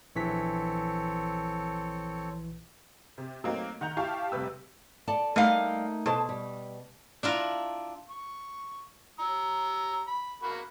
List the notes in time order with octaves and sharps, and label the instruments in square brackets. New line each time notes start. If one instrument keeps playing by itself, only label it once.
[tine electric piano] A#1 E3 B6 [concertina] C4 A4 C#5
[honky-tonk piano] C3
F#3 A3 A#3 C4 D#4
D#3 F#5 A#5 G6 F7
E4 G4 F5 A5 C#6
F1 C3 G3 B4 E6
[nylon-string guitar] A4 D5 A5
[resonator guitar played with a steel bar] G3 F5 [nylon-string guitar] A3 A#3 D#4
[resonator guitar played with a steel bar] B2 [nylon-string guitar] A4 C5 A5
[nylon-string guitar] G3
[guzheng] D4 E4 F4 A#5
[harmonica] C#6
A#5 E6
B5
A#3 F#4 B5